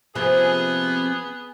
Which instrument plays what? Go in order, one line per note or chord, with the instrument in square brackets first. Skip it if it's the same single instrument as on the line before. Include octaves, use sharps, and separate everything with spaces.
[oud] C3 F3 A#3 [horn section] B3 G#4